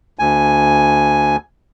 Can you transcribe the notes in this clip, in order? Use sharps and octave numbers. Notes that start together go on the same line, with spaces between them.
D2 G#5